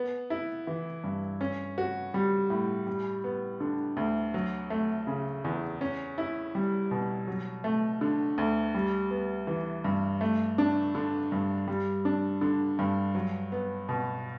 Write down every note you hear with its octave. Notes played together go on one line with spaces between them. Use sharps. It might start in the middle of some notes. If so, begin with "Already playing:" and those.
Already playing: B3
E4
E3
G2
C#4
F#4
G3
A2
G3
B3
D3
D2
F#3
A3
C#3
E2
C#4
E4
G3
B2
F#3
A3
D3
D2
G3
B3
E3
G2
A3
D4
D3
G2
G3
D4
D3
G2
F#3
B3
B2